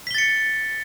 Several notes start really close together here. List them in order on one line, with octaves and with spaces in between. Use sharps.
B6 G7 A6 C#7